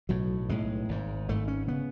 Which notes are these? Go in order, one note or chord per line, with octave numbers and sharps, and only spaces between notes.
B1 A2 F#3
B1 A2 G#3
G#1 G#2
G#1 G#2 A3
C#4
C#3 B3